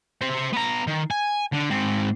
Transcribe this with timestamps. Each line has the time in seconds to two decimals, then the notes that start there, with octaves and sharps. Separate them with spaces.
0.22 C5 E5
0.53 B3 A#5
0.87 D#3
1.11 G#5
1.52 D3
1.70 G#2 C4